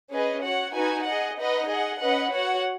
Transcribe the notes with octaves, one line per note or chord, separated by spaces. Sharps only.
C#4 G#4 B4 D#5
F#4 C#5 F#5
D#4 F#4 B4 G#5
G#4 D#5 F#5
D#4 B4 D#5 F#5
G#4 D#5 F#5
C#4 B4 D#5 F#5
F#4 C#5 F#5